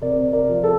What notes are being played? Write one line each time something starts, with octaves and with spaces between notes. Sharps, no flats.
C3 A#4 D5
A#4 D5
F3
A4